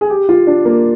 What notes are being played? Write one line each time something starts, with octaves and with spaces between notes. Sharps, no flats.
G#4
G4
F4
D4
A#3